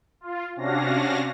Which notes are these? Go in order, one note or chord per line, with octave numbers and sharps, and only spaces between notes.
F4
C3 C#4 D4 F#4 F5 A#6